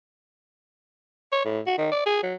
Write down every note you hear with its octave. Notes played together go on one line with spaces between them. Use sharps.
C#5
A2
F#4
D#3
D5
G#4
F#3